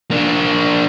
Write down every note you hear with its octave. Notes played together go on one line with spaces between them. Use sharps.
A#3 D4